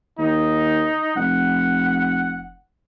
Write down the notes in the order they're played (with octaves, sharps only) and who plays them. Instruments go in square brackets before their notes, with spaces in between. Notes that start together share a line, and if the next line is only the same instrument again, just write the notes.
[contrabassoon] D#2 [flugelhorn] D#4
[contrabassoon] F1 [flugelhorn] F#5